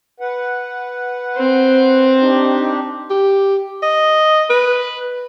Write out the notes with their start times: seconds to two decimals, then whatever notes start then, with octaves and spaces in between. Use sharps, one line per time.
0.20 B4 F#5
1.37 C4
2.20 D4 D#4 G4
3.10 G4
3.83 D#5
4.50 B4